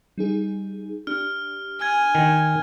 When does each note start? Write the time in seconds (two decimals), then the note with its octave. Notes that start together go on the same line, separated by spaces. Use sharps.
0.18 G3 D#4 G#4
1.07 D4 G4 F6
1.81 G#5 F6 G#6
2.15 D#3